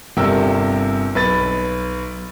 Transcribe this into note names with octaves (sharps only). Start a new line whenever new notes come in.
G1 C3 A#4 G5 E6
B1 B4 A6